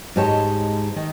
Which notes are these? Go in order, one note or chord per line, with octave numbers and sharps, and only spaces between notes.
G#2 G#3 G4 C#5 A5
D#3 D#4